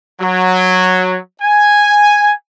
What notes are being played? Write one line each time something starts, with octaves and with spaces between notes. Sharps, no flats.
F#3
G#5